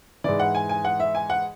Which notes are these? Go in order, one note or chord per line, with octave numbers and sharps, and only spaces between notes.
G#2 E3 D5
F#5
G#5
G#5
F#5
E5
G#5
F#5